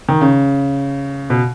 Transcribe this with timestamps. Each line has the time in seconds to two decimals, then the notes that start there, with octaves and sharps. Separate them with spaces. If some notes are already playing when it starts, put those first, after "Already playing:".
0.09 D#3
0.21 C#3
1.30 B2